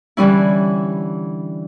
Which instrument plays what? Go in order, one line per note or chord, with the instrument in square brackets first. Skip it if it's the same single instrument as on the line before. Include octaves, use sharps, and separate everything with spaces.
[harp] D3 E3 G3 C#4 E4